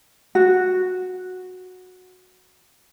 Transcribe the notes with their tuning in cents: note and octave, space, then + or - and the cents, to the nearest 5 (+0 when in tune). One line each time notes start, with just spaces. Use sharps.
F#4 -10